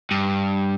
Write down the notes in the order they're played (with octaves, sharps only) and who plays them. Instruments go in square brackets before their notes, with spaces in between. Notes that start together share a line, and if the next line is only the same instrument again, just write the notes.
[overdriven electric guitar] G2